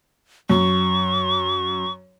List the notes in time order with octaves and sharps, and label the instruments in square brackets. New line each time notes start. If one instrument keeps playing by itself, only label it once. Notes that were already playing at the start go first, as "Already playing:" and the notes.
[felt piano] F#2 [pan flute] C#6